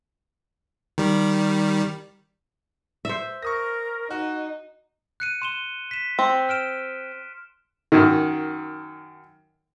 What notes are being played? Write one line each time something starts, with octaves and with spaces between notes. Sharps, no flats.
D#3 G3
C5 E5
A#4 C#6 D#6 A#6
D#4 F#4
F#6 C#7 D#7
C6 E7 G7
B6 E7
C4
F6 D7 E7
F#2 D#3